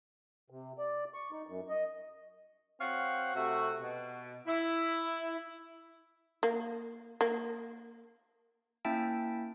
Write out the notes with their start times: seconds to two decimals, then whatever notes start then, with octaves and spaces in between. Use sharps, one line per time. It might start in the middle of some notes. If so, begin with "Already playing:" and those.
0.50 C3
0.78 D5
1.14 C#6
1.32 D#4
1.47 F#2
1.69 D#5
2.80 C4 F#4 C#5 F5 F#5
3.34 C3 A3 F#4
3.81 B2
4.47 E4
6.43 A#3
7.21 A#3
8.85 A#3 C#4 E4 E5 G5 A5